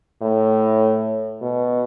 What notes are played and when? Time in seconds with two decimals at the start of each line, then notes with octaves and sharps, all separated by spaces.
0.22 A2
1.42 B2